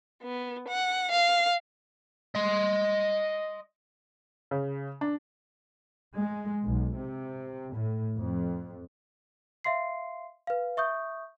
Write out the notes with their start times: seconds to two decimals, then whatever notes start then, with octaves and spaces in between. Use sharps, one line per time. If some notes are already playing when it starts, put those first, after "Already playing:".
0.22 B3
0.68 F#5
1.11 F5
2.35 D#5 C6
4.51 C#3
5.01 D4
6.16 G#3
6.64 B1
6.95 C3
7.74 A2
8.16 F2
9.64 E5 F5 C6 C7
10.47 B4 F5
10.77 E5 C#6 D#6 G6